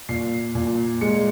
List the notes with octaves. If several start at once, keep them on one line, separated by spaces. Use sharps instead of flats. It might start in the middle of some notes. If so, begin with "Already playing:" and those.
A#2 C7
A#2
G#3 C#7